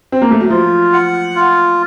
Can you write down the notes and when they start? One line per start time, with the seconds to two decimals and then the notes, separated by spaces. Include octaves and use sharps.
0.12 C4
0.22 A#3
0.31 A3
0.41 F#3
0.50 F3 F4
0.93 F#5
1.35 F4